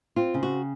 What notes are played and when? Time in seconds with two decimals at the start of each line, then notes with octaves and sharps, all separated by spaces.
0.16 C4 F4
0.34 C#3
0.43 F#4